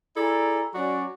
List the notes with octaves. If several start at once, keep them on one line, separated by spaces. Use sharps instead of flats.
E4 G#4 A4 D5 A#5
F#3 C#4 F#4 D5